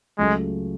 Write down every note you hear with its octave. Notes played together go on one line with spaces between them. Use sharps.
C#2 C#3 F#3 G#3 A3